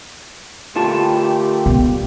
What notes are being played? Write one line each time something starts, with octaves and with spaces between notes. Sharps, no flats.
A#2 D3 A3 F4 G4 A5
B2